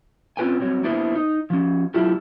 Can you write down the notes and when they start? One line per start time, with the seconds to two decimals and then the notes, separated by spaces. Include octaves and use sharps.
0.37 C4 C#4 F4 B4 G5 G#5
0.60 F#3 G3 C4 C#5
0.84 A#3 B3 D4 E4 C5
1.15 D#4
1.50 F3 C#4
1.94 F#3 A3 D4 E4 F4 G4